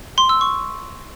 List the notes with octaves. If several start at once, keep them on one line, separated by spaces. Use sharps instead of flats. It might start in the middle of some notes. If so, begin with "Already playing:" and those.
C6
E6
C#6